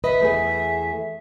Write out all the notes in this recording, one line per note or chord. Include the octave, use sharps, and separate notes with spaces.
B4 D#5 E5
E2 A3 G#4